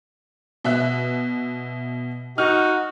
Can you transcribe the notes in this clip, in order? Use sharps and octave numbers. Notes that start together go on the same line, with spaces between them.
B2 E5 F#6
D#4 F#4 F6